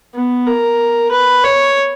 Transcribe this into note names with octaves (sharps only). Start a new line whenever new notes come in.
B3
A#4
B4
C#5